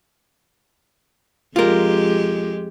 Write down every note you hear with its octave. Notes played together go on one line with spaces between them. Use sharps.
F2 G#3 F4 G4 A#4